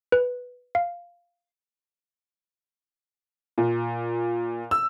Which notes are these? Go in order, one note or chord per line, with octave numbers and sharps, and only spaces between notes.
B4
F5
A#2
E6